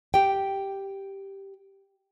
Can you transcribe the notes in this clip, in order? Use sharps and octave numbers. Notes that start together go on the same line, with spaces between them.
G4 G5